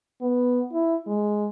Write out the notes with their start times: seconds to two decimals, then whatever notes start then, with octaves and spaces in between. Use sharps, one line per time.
0.21 B3
0.72 E4
1.07 G#3